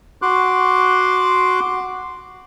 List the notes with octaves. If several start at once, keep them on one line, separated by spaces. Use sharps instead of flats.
F#4 C6 D6 F#6